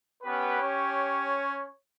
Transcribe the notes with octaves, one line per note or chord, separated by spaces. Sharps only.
B3 C#4 G4 B4
C#4 C#5